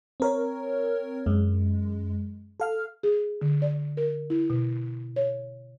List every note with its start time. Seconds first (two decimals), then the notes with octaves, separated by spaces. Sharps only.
0.20 C4 A#4 C#5
1.26 F#2 G#3
2.60 A4 F5 F6
3.03 G#4
3.41 D3
3.62 D5
3.97 A#4
4.30 E4
4.50 B2
5.16 C#5